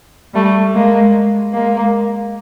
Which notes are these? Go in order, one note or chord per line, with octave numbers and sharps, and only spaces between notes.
G3 A3
G#3 A#3
G#3 A#3